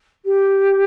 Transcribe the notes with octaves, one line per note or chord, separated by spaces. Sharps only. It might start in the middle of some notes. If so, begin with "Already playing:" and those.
G4